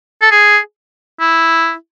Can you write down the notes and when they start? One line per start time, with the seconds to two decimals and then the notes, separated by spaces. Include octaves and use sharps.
0.22 A4
0.32 G#4
1.20 E4